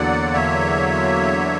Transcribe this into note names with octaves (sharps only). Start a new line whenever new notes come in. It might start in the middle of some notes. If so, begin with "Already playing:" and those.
Already playing: E2 D3 F#3 A#3 D5 F#5
C#5 E5